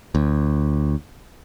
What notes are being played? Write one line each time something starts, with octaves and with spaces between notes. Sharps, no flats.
D2